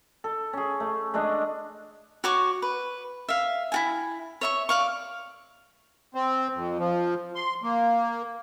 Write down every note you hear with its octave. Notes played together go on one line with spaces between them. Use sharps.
A4
C#4 G#4
A3
G#3 A3 D4 D#5
F#4 C#5 C#6 D6
B4
E5 F5
E4 F#4 G#5
C#5 E5 C#6
D5 F5 C#6
C4
F2
F3
C6
A#3